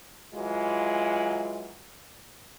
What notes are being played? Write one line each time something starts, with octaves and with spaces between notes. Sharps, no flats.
E3 F#3 G#3 F4